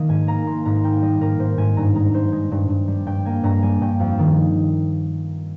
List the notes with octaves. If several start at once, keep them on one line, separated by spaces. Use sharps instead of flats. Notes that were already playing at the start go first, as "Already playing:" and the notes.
Already playing: D#3 A#3 D#5
G#2 G#5
A#3 A#5
A#3 C6
G#2 A#5
A#3 G5
G3 D#5
G#2 A#4
G#2 C5
G#2 G#5
G2 A#5
G#3 A#5
G2 C5
G#3
G2
G2
G3
G2 G5
A#3 G#5
G2 A#5
G3 G#5
G2 G5
F2 F5
D#3